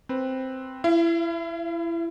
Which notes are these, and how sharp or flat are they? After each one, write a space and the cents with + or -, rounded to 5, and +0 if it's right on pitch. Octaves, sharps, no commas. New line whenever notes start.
C4 +0 B4 +0
E4 +25 F5 -40